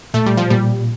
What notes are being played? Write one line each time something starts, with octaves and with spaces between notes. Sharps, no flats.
A#2 A3
G3
F3
A#2 G3